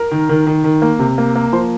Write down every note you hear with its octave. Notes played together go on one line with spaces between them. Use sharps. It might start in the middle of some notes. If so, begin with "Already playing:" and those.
Already playing: A#4
D#3
D#3
D#3
D#3
A#3
C3
A#3
A#3
F3 C5